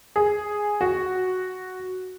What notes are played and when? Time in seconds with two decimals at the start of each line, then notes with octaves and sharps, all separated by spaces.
0.16 G#4
0.81 F#4